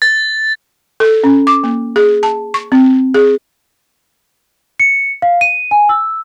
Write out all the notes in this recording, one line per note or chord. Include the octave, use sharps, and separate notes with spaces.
A6
A4
C#4
D6
A#3
G#4
A5
C#6
C4
G#4
C#7
F5
D#7
G#5
E6